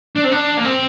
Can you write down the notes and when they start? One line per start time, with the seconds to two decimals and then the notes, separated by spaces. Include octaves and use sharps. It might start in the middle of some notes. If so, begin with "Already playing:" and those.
0.16 D4
0.24 C4
0.32 D4
0.57 A#3
0.65 C4